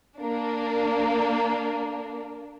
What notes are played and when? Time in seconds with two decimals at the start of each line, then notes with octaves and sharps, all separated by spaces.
0.17 A#3 D4